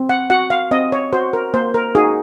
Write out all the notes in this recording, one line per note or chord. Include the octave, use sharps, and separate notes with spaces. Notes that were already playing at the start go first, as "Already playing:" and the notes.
Already playing: C4
F#5
F#4 F#5
F5
C4 D#5
C#5
F#4 C5
A#4
A#3 C5
A#4
D#4 F#4 G#4